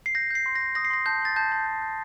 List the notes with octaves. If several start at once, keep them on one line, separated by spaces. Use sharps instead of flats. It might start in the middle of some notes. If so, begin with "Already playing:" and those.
C7
G6 A#6
G6 C7
C6
A#6
G6
D#6 A#6
C7
C6 A#6
A5 G6
C6 A6
A5 G6
A5
G6
G6